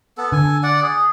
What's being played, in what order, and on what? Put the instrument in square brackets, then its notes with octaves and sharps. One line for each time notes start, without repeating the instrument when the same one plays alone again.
[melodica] B3 A4
[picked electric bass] D3 [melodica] A4 G#5
[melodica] D5 F#5
G#4